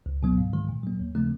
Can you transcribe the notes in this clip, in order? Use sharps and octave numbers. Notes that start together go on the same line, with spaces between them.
C#2
B2 F#3 B3
G#2
D#3 G#3
A#2
F#3 A#3
D#2
C#3 F3 A3 C4